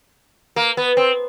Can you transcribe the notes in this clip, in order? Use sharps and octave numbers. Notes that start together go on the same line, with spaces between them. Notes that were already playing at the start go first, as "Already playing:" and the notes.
A#3
B3
C4